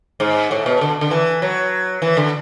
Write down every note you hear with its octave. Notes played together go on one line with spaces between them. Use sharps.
G#2
A2
B2
D3
D3
E3
F#3
E3
D3